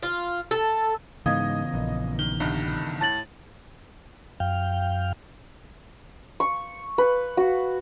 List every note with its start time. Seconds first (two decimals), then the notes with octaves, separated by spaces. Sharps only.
0.03 F4
0.51 A4
1.26 G#2 C#3 E3 B3 D#5 F5 D#6 G#6
1.74 A#1
2.19 D#3 G7
2.40 C2 G2 D#3
3.01 A2 A5 A6 F#7
4.40 F#2 F5 G5
6.40 C#6
6.98 B4
7.37 F#4